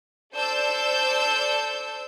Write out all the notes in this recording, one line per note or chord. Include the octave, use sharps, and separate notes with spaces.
A4 C5 D5 A5 E6 G6